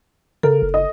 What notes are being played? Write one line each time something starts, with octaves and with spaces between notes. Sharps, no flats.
C#3 A4 A#4
F#1
D#5